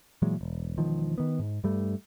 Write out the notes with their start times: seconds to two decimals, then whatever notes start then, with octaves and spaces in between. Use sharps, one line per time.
0.22 A#2 E3 F#3 G#3
0.41 E1
0.78 E1 D#3 F3
1.18 D#3 B3
1.39 G#2
1.64 G2 G3 A3